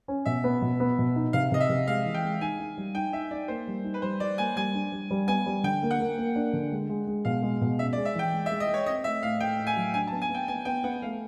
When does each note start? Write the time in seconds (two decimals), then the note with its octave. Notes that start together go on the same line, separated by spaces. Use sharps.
0.08 C#4
0.26 B2 E5
0.44 B3
0.62 B2
0.80 B3
0.98 B2
1.16 D#4
1.33 C3 F5
1.52 C3 D#5
1.60 E5
1.69 C3
1.88 G#3 F5
2.05 E3
2.14 G5
2.24 G#3
2.41 D#4 G#5
2.59 D#4
2.78 G3
2.95 D#4 G5
3.13 D#4 E5
3.31 D#4 D5
3.48 A#3 C5
3.67 G3
3.84 D#4
3.94 B4
4.02 G3 C5
4.20 G3 D5
4.38 A#3 G#5
4.56 G3 G#5
4.74 D4
4.92 G3
5.11 G3
5.27 B3 G#5
5.46 G3
5.63 D3 G5
5.82 A#3
5.91 F#5
6.00 A#3
6.18 A#3
6.36 D4
6.53 D3
6.72 G#3
6.89 G#3
7.07 G#3
7.25 B2 F5
7.43 G#3
7.61 B2
7.79 C#4 E5
7.93 D5
7.97 G#3
8.05 E5
8.15 E3 G5
8.33 G#3
8.46 E5
8.51 G#3
8.60 D#5
8.68 G#3
8.74 C#5
8.86 C4 D#5
9.04 A3 E5
9.22 A2 F5
9.40 A3 G5
9.59 A2
9.67 G#5
9.76 F#3
9.94 D4 G#5
10.07 A5
10.12 B3
10.22 G#5
10.30 B3 G5
10.48 B3 G#5
10.65 B3 G5
10.84 B3 F#5
11.02 A3 F5